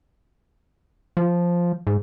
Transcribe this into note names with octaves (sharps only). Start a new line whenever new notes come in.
F3
G#2